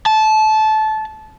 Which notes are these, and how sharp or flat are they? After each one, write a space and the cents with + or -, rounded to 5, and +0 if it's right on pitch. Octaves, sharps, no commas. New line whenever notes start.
A5 -20